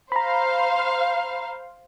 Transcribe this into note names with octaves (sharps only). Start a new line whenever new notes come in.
C5 F5 A#5 B5